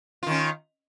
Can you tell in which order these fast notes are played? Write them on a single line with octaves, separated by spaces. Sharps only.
F4 D#3 C#4